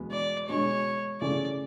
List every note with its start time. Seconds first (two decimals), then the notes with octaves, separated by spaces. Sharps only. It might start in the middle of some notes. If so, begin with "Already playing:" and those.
Already playing: E2 B2 G#3 B3
0.12 D5
0.48 B2 G#3 D4 F#4 C#5
1.21 C#3 E3 A3 C#4 G#4 D5